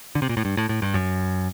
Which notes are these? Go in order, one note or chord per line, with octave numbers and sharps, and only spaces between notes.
D3
C3
A#2
A2
G2
A2
A2
G2
F#2